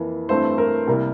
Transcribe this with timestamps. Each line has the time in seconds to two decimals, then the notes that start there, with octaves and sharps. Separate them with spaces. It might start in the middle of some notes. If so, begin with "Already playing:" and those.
Already playing: F2 E3 A#3
0.29 G2 E3 A3 C4 C5
0.58 A#4
0.87 C2 C3 G3 A#3 A#4